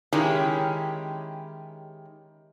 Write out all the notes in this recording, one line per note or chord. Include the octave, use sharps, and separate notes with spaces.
D#3 G#3 C#4 E4 G4